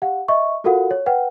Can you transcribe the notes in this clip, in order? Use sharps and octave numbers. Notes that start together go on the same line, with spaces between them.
G4 F5 F#5
D#5 E5 C#6
F4 F#4 A4 A#4 F5 F#5
C#5
B4 F#5 G5